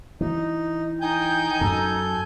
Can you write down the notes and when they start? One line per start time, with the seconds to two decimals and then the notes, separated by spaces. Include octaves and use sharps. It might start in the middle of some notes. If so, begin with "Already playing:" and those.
0.21 E3 D#4
1.01 D#4 G5 G#5 G6
1.61 F#2 A4